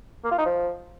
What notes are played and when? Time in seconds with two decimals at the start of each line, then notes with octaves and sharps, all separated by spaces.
0.24 A#3
0.31 F4
0.38 D#4
0.45 F3